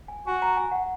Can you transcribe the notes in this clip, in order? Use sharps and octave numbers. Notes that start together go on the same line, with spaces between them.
G#5
F#4 G#5
A#5
G#5
F#5